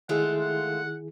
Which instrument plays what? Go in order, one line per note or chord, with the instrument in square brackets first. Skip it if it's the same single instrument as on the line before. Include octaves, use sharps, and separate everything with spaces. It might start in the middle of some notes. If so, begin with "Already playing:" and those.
[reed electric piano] D#3 E4 G#4 [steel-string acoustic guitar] G#3 A3 F4 [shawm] F#5
[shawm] F#5